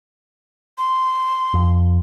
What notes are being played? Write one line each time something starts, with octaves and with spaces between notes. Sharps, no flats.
C6
F2